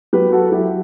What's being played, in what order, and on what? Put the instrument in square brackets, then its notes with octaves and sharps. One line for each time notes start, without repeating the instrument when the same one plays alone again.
[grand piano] F#3 G4 B4
F#4 A4
F#3 E4 G4